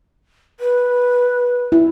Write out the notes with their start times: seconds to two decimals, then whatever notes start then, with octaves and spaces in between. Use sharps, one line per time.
0.60 B4
1.72 E4